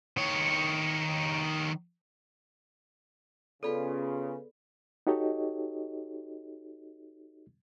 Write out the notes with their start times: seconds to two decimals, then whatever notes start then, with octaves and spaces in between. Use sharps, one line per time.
0.17 D#3 C#5
3.63 C#3 B3 F4 G#4 A4 B4 D5 B5
5.07 D#4 F#4 G4 A4 C#5 D#5